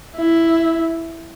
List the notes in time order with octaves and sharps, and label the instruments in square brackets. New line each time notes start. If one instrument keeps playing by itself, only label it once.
[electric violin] E4